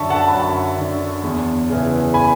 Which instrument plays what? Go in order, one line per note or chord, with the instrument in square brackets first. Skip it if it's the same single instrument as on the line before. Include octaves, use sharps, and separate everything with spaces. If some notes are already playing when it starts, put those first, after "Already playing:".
Already playing: [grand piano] F#2 D3 E5 A5 C#6
F#5 A5
B5
F#2 F#5 A5
D3
E2
C#3 E3
G#5 B5